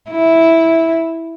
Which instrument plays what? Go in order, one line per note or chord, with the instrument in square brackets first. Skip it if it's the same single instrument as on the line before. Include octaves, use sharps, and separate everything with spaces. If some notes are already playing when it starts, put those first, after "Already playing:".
[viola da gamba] E4